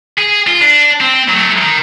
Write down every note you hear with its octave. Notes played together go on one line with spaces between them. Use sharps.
G#4
F4
D4
C4
F#3 A3
D#3